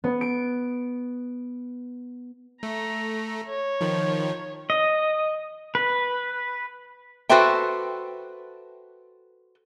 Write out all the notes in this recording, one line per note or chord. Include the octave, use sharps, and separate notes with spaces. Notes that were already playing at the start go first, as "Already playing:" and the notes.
B3
D7
A3 A#5
C#5
D#3 F3
D#5
B4
F#4 A4 B4 C5 E5 G5